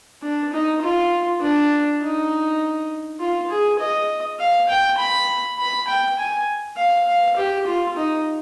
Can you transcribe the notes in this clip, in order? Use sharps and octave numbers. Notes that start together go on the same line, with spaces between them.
D4
D#4
F4
D4
D#4
F4
G#4
D#5
F5
G5
B5
B5
G5
G#5
F5
F5
G4
F4
D#4